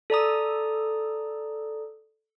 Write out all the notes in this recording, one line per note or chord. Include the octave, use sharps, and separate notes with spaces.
A4 D5 A#5 D#6